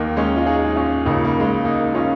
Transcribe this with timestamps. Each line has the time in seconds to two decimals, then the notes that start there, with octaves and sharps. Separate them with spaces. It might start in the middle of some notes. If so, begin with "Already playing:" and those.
Already playing: D#2 D#3 A#3
0.16 G#3 C#4
0.36 F4
0.46 D#4 G#4
0.76 C#4 F4
1.05 C#2 C#3 A#3 D#4
1.25 A#3
1.40 G#3
1.45 A#3
1.65 A#3 D#4
1.95 C#4 F4